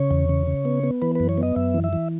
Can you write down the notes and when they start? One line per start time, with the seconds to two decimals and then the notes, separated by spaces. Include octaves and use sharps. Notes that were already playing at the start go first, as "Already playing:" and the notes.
Already playing: C#3 C#5
0.11 E2
0.29 C#3
0.47 C#3
0.65 B3
0.84 B3
1.02 E3 B4
1.15 F#2 B4
1.29 C#5
1.38 B3
1.43 D#5
1.56 F#2 E5
1.74 E3
1.84 E5
1.93 E3